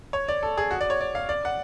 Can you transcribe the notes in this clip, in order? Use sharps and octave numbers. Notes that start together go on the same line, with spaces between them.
C#5
D5
A4
G#4
F#4
D5
C#5
D5
F5
D5
F#5